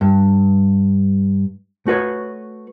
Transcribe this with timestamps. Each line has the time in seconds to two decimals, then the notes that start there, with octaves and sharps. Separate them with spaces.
0.01 G2
1.87 A3 F#4 B4 C#5